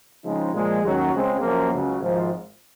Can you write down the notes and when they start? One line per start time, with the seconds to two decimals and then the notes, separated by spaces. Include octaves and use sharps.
0.25 C#3 F3 G#3 C4 D#4
0.54 A#2 F3 G#3
0.83 D#2 D#3 F#3 C#4 F#4
1.12 C#2 C#3 G#3 C4
1.41 F#2 F3 A#3
1.71 C#2 C#3 F#3
2.00 G#1 G#2 F3